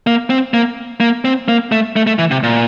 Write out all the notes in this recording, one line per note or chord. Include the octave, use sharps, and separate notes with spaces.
A#3
C4
A#3
A#3
C4
A#3
A3
A3
A3
E3
C3
A#2